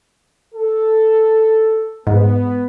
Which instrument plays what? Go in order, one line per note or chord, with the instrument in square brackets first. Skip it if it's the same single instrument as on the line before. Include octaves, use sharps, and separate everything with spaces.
[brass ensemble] A4
[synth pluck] G#2 [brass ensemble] B3